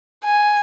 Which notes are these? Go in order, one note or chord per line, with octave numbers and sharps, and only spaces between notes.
G#5